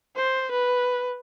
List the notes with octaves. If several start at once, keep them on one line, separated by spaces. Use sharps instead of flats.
C5
B4